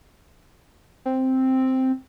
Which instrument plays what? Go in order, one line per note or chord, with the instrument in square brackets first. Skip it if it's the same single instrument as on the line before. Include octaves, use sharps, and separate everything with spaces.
[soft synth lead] C4